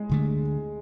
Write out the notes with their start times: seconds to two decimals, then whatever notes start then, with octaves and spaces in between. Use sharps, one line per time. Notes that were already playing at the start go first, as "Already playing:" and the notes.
Already playing: G#3
0.09 D2 D3 A3